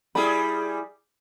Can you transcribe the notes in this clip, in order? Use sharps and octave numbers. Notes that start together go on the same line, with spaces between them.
G3 E4 G#4 B5